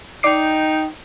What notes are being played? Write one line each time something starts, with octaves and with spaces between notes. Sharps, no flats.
D#4 D5 G5 D6 C7